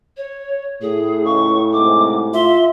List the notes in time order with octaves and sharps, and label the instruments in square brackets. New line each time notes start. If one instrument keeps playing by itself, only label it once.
[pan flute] C#5
[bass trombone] A2 [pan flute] G#4
[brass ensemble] C#2 C#3 [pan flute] C#6
[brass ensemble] G#2 C3 G#3 [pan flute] D6
[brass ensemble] F4 [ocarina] E5 [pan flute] C6